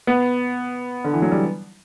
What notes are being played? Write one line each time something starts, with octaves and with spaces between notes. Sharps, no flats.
B3
D3
E3
F#3
G3